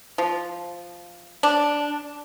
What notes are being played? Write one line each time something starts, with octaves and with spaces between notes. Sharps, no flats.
F3
D4